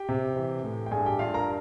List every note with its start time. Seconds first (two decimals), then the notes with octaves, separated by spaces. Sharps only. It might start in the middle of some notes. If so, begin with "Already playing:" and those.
Already playing: G4 G5
0.09 C3
0.36 E3
0.64 A2
0.86 G5
0.91 G2 G#4 G#5
1.06 G4 G5
1.19 G2 F4 F5
1.34 A#4 A#5